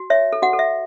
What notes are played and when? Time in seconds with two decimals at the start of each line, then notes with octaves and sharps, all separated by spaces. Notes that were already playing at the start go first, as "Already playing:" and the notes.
Already playing: F#4
0.10 C#5 E5
0.33 A4
0.42 F#4 F#5
0.53 A4
0.59 E5